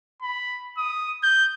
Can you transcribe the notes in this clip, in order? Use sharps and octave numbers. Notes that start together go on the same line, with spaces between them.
B5
D#6
G6